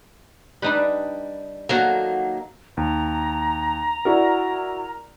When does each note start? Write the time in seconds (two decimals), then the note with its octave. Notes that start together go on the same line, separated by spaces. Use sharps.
0.62 G3 D4 D#4 B4
1.69 D#3 F#3 A#3 F#4 A4
2.77 D#2 A#5
4.05 E4 F#4 A#4 D5